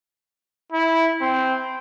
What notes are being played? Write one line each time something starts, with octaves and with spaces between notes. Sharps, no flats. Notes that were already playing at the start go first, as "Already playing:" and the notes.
E4
C4